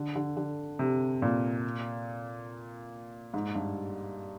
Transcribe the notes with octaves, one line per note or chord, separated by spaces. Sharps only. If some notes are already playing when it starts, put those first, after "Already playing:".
Already playing: D3
D3
D3
C3
A#2
G#2
G2